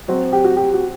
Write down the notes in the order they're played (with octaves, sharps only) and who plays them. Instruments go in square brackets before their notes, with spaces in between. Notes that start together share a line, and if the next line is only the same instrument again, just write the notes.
[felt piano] F#3 C4 F#4 C5
[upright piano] G4
F#4
G4
F#4